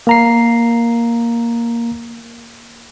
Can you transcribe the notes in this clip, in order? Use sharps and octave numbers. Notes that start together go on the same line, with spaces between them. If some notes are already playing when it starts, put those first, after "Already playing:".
A#3 A#5 C7